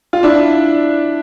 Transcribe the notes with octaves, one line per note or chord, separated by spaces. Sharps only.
F4
D4 E4